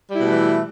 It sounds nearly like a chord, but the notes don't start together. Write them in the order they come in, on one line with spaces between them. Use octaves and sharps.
G3 E4 B2 A3 E3